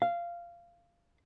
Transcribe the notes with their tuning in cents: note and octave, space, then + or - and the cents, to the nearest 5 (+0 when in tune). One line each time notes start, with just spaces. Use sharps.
F5 -15